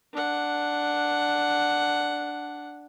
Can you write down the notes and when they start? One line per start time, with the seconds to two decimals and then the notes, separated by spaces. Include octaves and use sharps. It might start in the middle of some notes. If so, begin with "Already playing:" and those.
0.13 D4 F#5